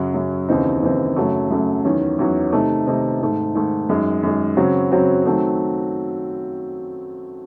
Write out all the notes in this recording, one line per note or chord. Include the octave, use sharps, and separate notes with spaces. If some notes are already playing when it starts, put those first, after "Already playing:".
Already playing: F#2 C#3 F#3
F#2 C#3 F#3
D#2 C#3 E3 C4 D#4
D#2 C#3 E3 C4 D#4
F#2 C#3 F#3 A3
F#2 C#3 F#3 A3
E2 D#3 F#3 C#4
E2 D#3 F#3 C#4
C3 D#3 A3 D#4
C3 D#3 A3 D#4
G#2 D#3 A3
G#2 D#3 A3
F#2 D#3 G#3
F#2 D#3 G#3
C#3 F#3 C4 F#4
C#3 F#3 C4 F#4
D#3 F#3 A3 C4